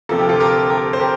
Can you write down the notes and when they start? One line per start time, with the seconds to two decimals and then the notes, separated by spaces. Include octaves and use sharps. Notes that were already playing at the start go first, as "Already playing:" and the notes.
0.09 D2 C3 F3 A#3 A4
0.19 G4
0.29 F4 A4
0.40 G4 A#4
0.70 G4 A#4
0.93 C5
1.00 G4 A#4